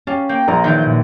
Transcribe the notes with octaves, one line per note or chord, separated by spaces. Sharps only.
C#4 G4 F5 A5
A#3 G5
A#1 F4 A#5
D#3 E3 F#3 G6
A#2